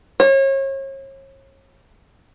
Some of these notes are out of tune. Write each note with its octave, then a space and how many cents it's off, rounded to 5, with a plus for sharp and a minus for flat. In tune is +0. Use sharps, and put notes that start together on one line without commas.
C#5 -35